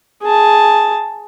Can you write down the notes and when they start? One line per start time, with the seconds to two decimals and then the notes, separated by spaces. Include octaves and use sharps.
0.23 G#4 A5